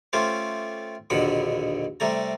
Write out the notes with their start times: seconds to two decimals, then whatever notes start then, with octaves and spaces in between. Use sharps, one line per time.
0.13 A3 C#4 F4 G4 C5
1.10 A#1 D#2 B2 D3 F#5 B5
2.00 C3 G3 A3 A#5